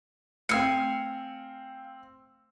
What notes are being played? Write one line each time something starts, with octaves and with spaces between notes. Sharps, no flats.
A3 C4 F5 G#5 E6 C#7